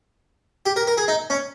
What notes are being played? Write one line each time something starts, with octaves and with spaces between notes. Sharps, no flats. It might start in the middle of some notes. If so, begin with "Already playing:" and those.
G4
A#4
A#4
G#4
D#4
C#4